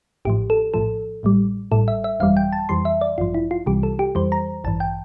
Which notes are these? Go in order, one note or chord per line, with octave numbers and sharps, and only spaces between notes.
A1 A2 F3 G4
A4
A#1 A2 F3 A4
A1 A2 G3
A1 A2 G3 A4
E5
E5
G1 F2 E3 G3 F5
G5
A5
F2 E3 G3 C6
E5
D5
A1 G2 F3 F4
E4
F4
C2 C3 E3 G3 G4
A4
G4
F2 E3 G3 C5
A#5
A1 G2 E3 A5
G5